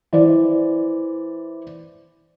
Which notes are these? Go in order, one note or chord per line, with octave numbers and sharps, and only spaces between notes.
E3 C5 D5